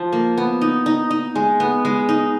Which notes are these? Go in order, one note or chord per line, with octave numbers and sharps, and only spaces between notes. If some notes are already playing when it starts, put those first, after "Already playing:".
Already playing: F3
A#3
B3
D#4
D#4
D#4
G#3
B3
G#3
D#4